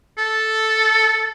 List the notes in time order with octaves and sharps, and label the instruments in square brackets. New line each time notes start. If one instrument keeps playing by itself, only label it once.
[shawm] A4